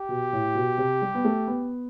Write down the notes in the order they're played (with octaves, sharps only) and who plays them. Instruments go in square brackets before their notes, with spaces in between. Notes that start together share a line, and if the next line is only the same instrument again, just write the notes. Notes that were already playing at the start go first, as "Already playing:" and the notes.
Already playing: [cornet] G4
[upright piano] B2
A2
B2
C3
G3
B3
A3
B3